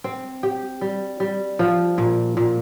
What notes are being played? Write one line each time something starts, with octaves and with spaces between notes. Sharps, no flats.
C4
G4
G3
G3
F3
A#2
A#2